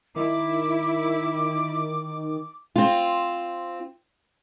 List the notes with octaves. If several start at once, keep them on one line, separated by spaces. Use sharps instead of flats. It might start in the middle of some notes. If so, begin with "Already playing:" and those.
D#3 E4 D6
C4 F4